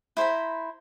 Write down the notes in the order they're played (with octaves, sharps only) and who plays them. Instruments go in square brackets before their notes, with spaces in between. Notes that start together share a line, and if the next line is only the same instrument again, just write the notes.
[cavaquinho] E4 C5 A#5 B5